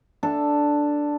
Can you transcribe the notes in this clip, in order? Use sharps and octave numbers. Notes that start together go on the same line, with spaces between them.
D4 A4